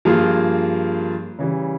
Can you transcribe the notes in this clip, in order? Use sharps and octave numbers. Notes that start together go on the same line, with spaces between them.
G2 F3 A#3 F4 G#4
C#3 E3 G3